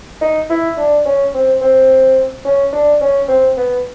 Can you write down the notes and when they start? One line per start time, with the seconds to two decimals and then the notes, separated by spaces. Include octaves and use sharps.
0.22 D#4
0.50 E4
0.77 D4
1.06 C#4
1.34 C4
1.61 C4
2.45 C#4
2.73 D4
3.01 C#4
3.28 C4
3.57 B3